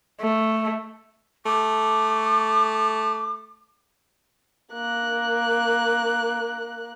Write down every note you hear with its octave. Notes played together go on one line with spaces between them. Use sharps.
A3
A3 D6
A#3 F#6